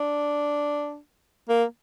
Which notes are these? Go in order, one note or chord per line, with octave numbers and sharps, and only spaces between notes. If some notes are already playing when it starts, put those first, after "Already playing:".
Already playing: D4
A#3